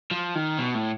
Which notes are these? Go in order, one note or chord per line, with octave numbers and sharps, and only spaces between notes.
F3
D#3
B2
A2